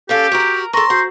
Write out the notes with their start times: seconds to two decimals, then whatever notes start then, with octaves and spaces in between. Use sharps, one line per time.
0.09 C#4 G4 A4 F5 A5
0.32 F#4 A#4 A#5
0.73 A4 A#4 A#5 C6 C#6 A#6
0.90 F#4 C5